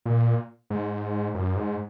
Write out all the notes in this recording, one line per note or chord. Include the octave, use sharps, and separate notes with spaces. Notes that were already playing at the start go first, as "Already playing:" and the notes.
A#2
G#2
F#2
G#2